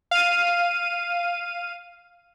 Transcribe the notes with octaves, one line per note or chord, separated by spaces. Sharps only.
F5 D#7